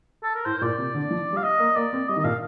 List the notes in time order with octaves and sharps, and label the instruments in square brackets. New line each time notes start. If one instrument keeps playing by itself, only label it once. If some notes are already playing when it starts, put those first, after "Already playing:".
[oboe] A4
A#4
[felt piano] A2 [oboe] C5
[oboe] C5
[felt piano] A#2 [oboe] D5
[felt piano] C3
D3
F3
G3
[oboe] F5
D#5
[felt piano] A#3
[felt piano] A#3 [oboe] D5
[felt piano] C4
[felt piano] G3 [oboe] D#5
[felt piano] D#3
[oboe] D#5
[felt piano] A#2 [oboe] F5